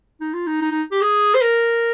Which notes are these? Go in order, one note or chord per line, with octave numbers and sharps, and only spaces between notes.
D#4
F4
D#4
D#4
D#4
G4
G#4
C5
A#4